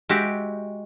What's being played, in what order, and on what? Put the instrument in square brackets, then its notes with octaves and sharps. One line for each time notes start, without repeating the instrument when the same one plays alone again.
[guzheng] G#3 F#4 G4 E5 G5